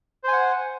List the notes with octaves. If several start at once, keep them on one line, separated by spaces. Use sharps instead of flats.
C5 F#5 G#5